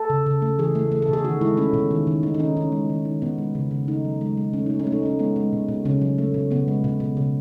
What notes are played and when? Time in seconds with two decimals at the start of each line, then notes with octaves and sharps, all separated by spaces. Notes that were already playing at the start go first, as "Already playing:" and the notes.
Already playing: A4
0.10 C#3
0.26 C#3
0.42 A3
0.59 E3 G#4
0.75 A3
0.92 A3
1.02 A4
1.08 B2 G#4
1.24 D#3 F#4
1.41 G#3 E4
1.57 A3 C#4
1.74 B2
1.91 D#3
2.07 D#3
2.23 A3 D#4
2.34 D#4
2.39 D#3 C#4
2.56 D#3 C#4
2.72 G#3
2.90 D#3
3.05 D#3
3.22 B2 B3
3.38 G#3
3.55 C#3
3.71 C#3
3.88 A3 D#4
4.04 F#3
4.21 G#3
4.37 G#3
4.53 A3 C#4
4.66 A3 D#4
4.79 C#4
4.87 A3
4.92 D#4
5.03 A3 C#4
5.19 G#3 B3
5.36 G#3
5.53 B2
5.68 B2
5.85 C#3 C#4
6.01 F#3
6.18 A3
6.34 B2
6.51 C#3 B3
6.68 G#3
6.84 B2
7.00 B2
7.17 C#3